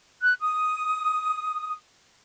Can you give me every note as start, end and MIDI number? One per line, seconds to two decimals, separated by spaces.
0.21 0.33 90
0.40 1.74 87